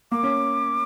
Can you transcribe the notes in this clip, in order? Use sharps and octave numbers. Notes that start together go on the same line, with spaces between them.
A#3 D6
C#4